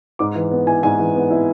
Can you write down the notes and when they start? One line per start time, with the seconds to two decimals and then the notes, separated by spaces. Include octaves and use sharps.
0.19 G#2 D6
0.35 E3
0.51 B3
0.67 E4 G#5
0.83 G#2 G#5
0.99 E3
1.15 B3
1.31 E4